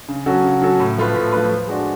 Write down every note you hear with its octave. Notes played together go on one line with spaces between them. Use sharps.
C#3
F#3 C#4 F#4 A4
C#3
F#3 C#4 F#4 A4
A2
F3 A3 F4 B4
A2
F3 A3 F4 B4
F3
G#3 D4 F#4